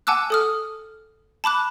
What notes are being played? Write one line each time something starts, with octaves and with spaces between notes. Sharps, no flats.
F#5 G#5 A5 D6 E6 F#6
A4 D#6 F6
A5 B5 D6 F#6